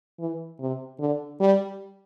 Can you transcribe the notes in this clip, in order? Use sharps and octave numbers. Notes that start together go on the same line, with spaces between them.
E3
C3
D3
G3